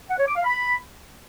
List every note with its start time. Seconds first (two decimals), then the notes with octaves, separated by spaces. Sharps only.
0.09 F#5
0.18 C#5
0.27 D6
0.35 F5
0.44 B5